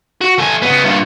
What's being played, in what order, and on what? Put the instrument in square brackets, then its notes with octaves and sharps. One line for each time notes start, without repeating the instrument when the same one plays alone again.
[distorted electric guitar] F#4
A3 G#5
C#3 B3
G2 A#2